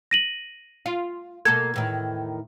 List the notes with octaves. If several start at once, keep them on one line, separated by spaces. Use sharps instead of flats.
A#6 D#7 F#7
F4
B2 A#3 A4 G#6
E2 A2 D#3